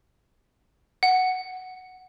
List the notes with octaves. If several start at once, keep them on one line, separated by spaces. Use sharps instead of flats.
F#5